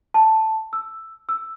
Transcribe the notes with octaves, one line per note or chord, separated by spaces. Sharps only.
A5
E6
E6